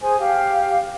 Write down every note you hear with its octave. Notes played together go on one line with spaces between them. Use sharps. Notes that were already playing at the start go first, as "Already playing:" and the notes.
G#4 C5 G#5
G4 F5